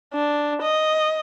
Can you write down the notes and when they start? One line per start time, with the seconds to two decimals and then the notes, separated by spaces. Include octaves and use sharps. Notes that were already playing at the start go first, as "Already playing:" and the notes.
0.14 D4
0.62 D#5